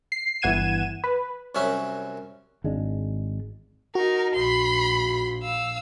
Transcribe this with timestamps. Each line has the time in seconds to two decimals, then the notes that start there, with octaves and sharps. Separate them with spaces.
0.12 C7
0.42 G1 E3 F#5 G#6 D#7 E7
1.04 B4
1.55 C2 F#2 F#3 C#4 E5
2.64 G#1 G#3 D4
3.95 D#4 F#4 A#4
4.35 A#1 B5 C6
5.43 F5 E6